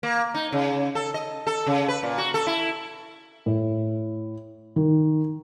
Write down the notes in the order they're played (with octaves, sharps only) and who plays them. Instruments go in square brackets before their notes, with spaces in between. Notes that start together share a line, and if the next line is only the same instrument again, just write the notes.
[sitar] A#3
D#4
C#3
A4
D#5
A4
C#3
B4
A#2
F#4
A4
E4
[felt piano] A2
D#3